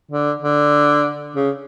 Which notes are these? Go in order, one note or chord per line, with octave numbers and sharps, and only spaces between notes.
D3
D3
C#3